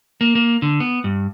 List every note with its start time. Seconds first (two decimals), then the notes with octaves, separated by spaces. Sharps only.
0.21 A#3
0.35 A#3
0.62 D3
0.80 B3
1.04 G2